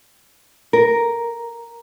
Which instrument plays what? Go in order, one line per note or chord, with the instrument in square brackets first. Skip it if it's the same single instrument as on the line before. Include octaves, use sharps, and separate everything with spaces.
[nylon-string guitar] A#4